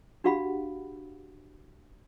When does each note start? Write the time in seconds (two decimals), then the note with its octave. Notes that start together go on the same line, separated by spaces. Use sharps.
0.24 D4 F#4 G4 F5 F#5 B5